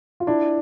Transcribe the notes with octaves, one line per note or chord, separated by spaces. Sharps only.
F4
D4 E4